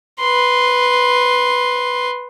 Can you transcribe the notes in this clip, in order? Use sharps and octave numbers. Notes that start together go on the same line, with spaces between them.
B4 C6